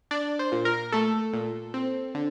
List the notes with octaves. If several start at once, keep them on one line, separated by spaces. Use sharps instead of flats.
D4 D5
C5
A#2
A#4
A3 A4
A#2
C4
D3